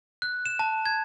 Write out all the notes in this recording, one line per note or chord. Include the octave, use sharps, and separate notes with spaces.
F#6
E7
A5
G#6